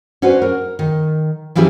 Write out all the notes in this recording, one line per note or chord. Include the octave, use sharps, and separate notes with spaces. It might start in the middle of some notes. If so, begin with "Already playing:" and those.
C#4 D4 F#4 B4 C5
A#4
D#3
E3 F3 C#4 E4 G4 G#4